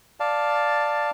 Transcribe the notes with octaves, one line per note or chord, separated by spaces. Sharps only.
D5 F5 A5